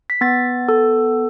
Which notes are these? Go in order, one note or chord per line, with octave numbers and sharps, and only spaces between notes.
B6
B3 A6
A4